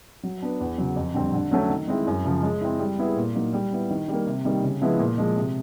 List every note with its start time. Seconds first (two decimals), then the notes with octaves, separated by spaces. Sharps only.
0.23 F#3
0.42 B3 D4
0.60 E2
0.78 C#3 F#3
0.96 F2
1.14 D3 G3 C4
1.34 D3
1.51 F#3 A3 C#4 F#4
1.70 D#3
1.88 G#3 C4 E4
2.07 F#2
2.25 C#3 F3
2.43 G#3
2.61 C4 E4
2.79 G3
2.98 B3 E4 G#4
3.16 A#2
3.35 F#3 A#3 D#4
3.53 G3
3.72 B3 E4
3.90 D#3
4.08 G3 A#3
4.26 C3
4.45 D#3 G3 A#3
4.62 C#3
4.81 F3 G#3 B3 E4
4.99 A#2
5.18 F3 G#3
5.36 C3